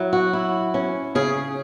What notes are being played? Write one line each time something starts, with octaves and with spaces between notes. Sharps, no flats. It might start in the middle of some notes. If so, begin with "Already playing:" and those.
Already playing: F#3 E4
F#4
E4
C#4
C#3 G#4